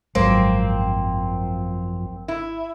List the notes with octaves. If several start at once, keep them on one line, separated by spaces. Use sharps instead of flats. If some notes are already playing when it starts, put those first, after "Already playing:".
G#1 F#2 F3 F#3 A#3 C4
E4